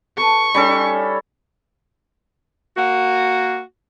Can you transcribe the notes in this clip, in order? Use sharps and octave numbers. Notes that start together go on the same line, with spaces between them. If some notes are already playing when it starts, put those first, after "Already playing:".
A4 B4 C#6
G3 C#4 D#4 A4
A#3 F#4